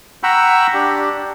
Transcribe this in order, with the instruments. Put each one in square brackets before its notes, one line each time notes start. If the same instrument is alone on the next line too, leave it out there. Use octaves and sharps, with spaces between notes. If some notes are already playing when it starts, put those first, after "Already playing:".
[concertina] F#5 G5 A#5 B5 C#6 E6
D4 G4